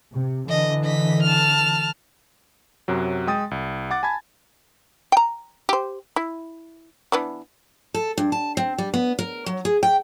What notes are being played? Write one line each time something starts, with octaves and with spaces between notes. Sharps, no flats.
C3
D3 E3 D#5
D#5 B6
A5 F6
F#2 C3 F#3
G#3 G5 D#6 A6
C2
F#5 D6 A6
G#5 A5 B5 G#6 A6
G5 A#5
G4 C5
E4
E3 B3 D4
A4
G2
A5
C4
G3
B3
A#4
F#3
G#4
G5